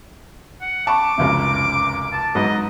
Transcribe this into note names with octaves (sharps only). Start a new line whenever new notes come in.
F#5
A5 B5 C#6 D6
F1 C#2 F#2
A5
G#2 F#3 B4 D#5